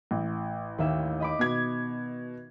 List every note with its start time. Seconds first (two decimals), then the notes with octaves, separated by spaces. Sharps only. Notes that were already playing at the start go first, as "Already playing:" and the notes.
0.11 A1
0.78 D#2 E5
1.20 D#5 B5 D6
1.39 B2 G#6